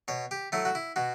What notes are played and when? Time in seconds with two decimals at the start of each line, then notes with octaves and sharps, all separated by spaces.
0.08 B2 C#5
0.31 G4
0.52 F#3 A3 E4
0.65 F#4
0.75 E4
0.96 B2 F#4